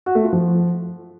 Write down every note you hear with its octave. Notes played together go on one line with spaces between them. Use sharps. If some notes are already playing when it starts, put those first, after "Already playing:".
F#4
A3
F4
F3